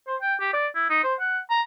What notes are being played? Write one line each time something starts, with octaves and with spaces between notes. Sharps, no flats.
C5
G5
G4
D5
E4
D#4
C5
F#5
A#5